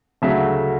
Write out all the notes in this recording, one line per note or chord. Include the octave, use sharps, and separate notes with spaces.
D2 C#3 F#3 A3 E5